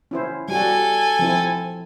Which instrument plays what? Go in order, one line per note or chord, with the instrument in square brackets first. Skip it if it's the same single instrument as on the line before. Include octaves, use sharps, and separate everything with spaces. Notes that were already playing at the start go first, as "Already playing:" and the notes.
[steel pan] C#4 E4 C5
[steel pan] G3 F#4 [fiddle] A4 G#5
[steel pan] F3 C4 E4